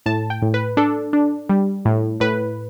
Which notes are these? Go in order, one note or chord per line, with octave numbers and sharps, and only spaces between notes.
A2 A5
G5
A2
B4
D4 A4
D4
G3
A2
A2 B4